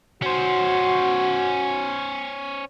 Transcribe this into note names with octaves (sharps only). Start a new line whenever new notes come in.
C#4 F#4 C5